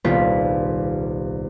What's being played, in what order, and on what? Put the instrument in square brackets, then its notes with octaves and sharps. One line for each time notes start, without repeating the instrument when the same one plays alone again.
[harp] D#1 C2 B3 C4 F4 B6